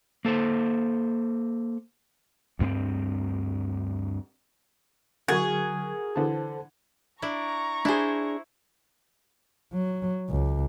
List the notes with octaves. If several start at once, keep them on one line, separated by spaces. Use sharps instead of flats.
A#3 A4 C5
D2 G2 B3 C4
D3 F#3 F#4 G#4 A#4 F#5 C#6 G#6
D3 E3 A4 C5 A5
D4 E4 A#5 C#6
D4 E4 G#4 C5
F#3
C#2